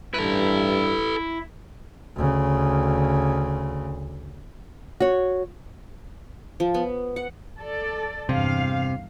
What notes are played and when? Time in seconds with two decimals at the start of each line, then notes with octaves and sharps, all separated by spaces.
0.14 G2 E4 A4 B4
2.16 D2 C#3
5.00 F#4 C#5
6.60 F3
6.74 B3
7.16 F#5
7.59 A4 D5
8.29 E2 G2 C3 F5